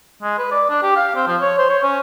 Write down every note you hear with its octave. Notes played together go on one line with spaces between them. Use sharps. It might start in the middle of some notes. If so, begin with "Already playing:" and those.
G#3
B4
D5
D4
G4
F5
C4
F3
C#5
C5
C#5
C#4